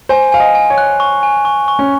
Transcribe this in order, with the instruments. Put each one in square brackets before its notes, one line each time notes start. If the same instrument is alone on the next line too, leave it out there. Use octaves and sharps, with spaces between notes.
[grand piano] C5 [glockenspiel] G#5
[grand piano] F5 [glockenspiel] G#5
[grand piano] D#5
[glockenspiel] G#5
[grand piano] C#5
[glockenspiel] F#6
C#6
G#5
C#6
C#6
[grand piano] C#4